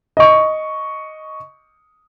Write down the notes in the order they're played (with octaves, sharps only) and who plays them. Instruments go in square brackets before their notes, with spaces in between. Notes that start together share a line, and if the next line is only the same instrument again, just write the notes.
[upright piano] D#5 C#6